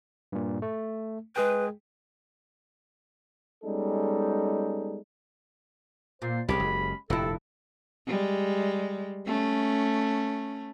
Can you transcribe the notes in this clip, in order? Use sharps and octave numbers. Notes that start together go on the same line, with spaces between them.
G2 A#2
A3
G#3 G#4 B4 G5
G3 G#3 B3 C#4 D#4 A4
A#2 C5
C2 G#3 C#4 G4 B5
F#1
F1 G2 A#2 E4 A4
G3 G#3
A3 C#4